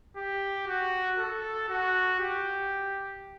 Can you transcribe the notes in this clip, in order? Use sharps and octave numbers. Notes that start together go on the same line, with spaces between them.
G4
F#4
A4
F#4
G4